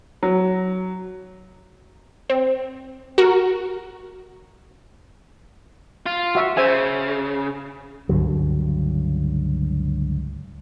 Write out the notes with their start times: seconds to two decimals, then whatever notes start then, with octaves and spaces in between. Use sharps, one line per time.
0.23 F#3
2.30 C4
3.18 F#4 A#4
6.06 F4
6.35 F#4 E5
6.57 C#3 C5 E5 G#5
8.09 C#2 G2 D3 F#3